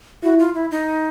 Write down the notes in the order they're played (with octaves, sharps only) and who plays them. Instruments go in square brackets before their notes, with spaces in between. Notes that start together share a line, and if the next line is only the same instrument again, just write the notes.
[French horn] E4 [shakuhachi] F#4
[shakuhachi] F4
E4
D#4